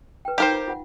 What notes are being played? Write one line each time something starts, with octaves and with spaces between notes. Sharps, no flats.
B4 G5
D#4 G4 A#4 C5 F5 G5
F4
F4 F#5